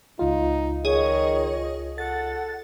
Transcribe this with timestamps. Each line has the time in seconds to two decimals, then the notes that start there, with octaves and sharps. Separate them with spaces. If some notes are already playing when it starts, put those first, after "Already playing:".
0.19 C#2 D#4 F4
0.85 D#3 G#4 C#5 D#5
1.98 A4 F#5 A6